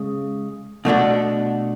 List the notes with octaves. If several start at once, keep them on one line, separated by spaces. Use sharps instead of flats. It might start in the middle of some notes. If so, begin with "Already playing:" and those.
Already playing: C#3 G#3
B2 A3 D4 F#4